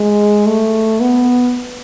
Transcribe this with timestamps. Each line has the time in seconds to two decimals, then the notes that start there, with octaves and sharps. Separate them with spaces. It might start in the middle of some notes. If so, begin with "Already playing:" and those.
Already playing: G#3
0.46 A3
1.01 B3